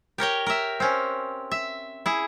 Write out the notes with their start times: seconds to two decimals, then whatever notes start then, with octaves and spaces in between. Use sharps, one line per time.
0.18 G4 A#4 C#5 G5
0.46 A#4 E5
0.80 C4 C#4
1.51 E5
2.06 E4 G#4